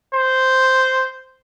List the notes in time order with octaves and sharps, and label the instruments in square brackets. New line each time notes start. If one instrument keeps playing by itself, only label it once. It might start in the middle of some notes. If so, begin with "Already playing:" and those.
[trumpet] C5